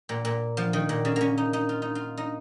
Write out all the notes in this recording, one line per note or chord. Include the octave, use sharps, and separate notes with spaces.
A#2
A#2
F3
D#3
A#2
C#3
A#3 C#4
D#4
D#4
F4
D#4
F4
D#4